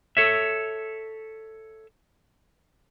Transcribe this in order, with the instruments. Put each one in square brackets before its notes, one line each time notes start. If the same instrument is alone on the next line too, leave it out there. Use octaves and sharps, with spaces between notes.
[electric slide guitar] A4 C#5 E5